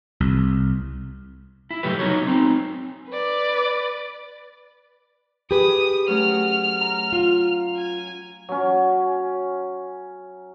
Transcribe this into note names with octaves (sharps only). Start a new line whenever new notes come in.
C2
E4
C#3 F#3 A3 G4 B4
F#3 B3 D#4 F#4 A#4 C#5
C4 D#4
B4 D5
G4 G#4 B4 D#6
F#3 A3 C#4 F6
A#5
F4
G#5
F#3 C#4